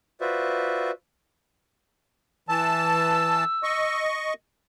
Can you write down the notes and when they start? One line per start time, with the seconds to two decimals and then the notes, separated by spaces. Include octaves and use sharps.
0.21 F4 F#4 B4 C5 D5 E5
2.49 E3 A5 E6
3.63 D#5 C#6